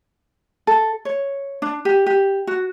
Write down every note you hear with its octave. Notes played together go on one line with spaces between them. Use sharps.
A4
C#5
D4
G4
G4
F#4